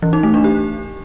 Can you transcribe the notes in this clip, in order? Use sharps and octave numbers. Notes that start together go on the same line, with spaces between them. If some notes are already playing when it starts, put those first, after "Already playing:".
E3
D#4
A3
D4
G4